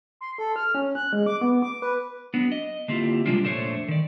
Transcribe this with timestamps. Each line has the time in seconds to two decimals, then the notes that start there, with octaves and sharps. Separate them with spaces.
0.21 C6
0.38 A4
0.56 F6
0.75 C#4
0.95 F#6
1.13 G#3
1.26 D6
1.41 B3
1.62 D6
1.82 B4
2.34 F#3 B3 D4
2.52 D#5
2.88 D3 A#3 C4 E4 F4 G4
3.26 C3 G3 G#3 D4 F4
3.43 F2 A#2 A3 D4 C5 C#5
3.88 D#3 D5